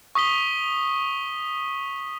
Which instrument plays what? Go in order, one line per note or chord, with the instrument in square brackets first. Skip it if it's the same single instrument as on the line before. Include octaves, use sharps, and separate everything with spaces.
[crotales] C#6 D#6 B6 G7